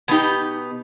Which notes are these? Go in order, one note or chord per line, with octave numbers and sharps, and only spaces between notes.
B2 B3 D#4 G4